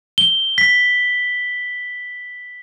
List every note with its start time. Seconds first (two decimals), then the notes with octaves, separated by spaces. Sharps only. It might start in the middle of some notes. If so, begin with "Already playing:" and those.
0.18 G7
0.58 B6